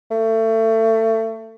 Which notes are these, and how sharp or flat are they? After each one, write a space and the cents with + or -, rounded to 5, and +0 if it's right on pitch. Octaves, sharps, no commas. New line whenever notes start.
A3 +25